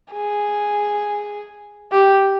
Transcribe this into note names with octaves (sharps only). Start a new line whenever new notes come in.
G#4
G4